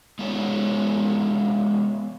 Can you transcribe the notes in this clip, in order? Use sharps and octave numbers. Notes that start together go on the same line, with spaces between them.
G#3 B3 D#4 F#4 G#4 C#5